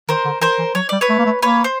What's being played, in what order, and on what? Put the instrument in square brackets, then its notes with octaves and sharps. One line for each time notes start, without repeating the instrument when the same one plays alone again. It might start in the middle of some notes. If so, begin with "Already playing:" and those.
[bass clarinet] D#3 [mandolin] A#4 C5
[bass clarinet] D3
[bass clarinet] E3 [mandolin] A#4 C5
[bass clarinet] E3
[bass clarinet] F#3 [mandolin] C#5
[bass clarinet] G3 [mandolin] D5
[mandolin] B4 C#5
[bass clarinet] A3
A#3
A3
[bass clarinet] A#3 [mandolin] B4 C#5
[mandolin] C5